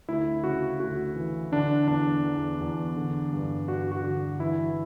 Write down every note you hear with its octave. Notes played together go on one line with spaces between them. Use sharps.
D2 E4
C#3 F#4
D2 F#4
E3
D3 D4
E2 D4
E2
E2
D3
G2
G2 F#4
F#4
D3
E3 E4